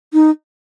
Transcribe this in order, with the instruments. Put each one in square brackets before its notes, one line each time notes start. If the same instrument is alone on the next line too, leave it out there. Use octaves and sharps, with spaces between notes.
[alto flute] D#4